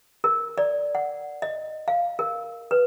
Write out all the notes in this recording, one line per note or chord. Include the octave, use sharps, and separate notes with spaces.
A#4
D5
F#5
D#5
F5
A#4
B4